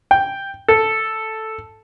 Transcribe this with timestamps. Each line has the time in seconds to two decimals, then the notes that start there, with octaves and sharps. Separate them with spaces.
0.11 G5
0.68 A4